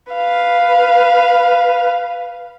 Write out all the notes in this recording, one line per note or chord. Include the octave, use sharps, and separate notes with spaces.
B4 F5